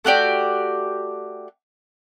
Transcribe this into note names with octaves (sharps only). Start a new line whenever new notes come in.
A3 F#4 G4 D5